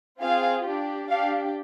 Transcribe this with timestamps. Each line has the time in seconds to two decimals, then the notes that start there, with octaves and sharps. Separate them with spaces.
0.21 C4 F4 G#4 F5
0.64 D4 G4
1.08 D4 G4 F5